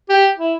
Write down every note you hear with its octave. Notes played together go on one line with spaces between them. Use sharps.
G4
E4